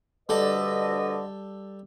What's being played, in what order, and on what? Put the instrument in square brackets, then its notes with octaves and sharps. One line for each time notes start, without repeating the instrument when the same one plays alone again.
[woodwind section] D2 B4 D#5 [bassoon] D3 [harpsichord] G3 A4